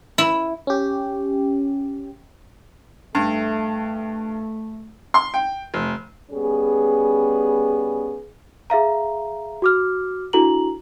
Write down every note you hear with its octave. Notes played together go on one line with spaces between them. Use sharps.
E4
C#4 G4
G2 A3
C6
G5
F1
G3 B3 C#4 G#4
G#4 E5 F5 A#5
F#4 D6 F6
D4 E4 F#4 A4 A#5 F#7